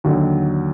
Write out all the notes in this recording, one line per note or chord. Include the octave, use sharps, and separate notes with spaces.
D#2 D3 F#3